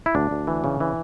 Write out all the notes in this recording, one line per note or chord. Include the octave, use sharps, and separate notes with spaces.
E4
D2 D4
D2
E3
C#3
E3